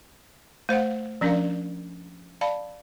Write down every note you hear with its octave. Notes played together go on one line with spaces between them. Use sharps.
A3 C5 F5 F#5
F3 C#4 D4 A#4 D5 F5
D5 F5 A5 B5